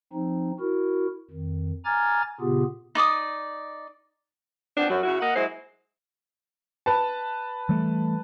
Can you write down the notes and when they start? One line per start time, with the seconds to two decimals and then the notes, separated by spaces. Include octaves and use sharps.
0.13 F3 C4 D#4
0.60 E4 F#4 A#4
1.31 F2 D#3
1.85 G#5 A#5 D6 F6 G#6 A6
2.40 A#2 C#3 B3 F4 G4 G#4
2.95 D#4 D5 D6 D#6
4.76 F3 B3 C4 D4
4.89 F#2 F#3
5.03 C#3 E4 F#4
5.21 A#3 D#5 F#5
5.35 F#3 G#3 E4 C5
6.86 B4 A5
7.69 E3 G3 A3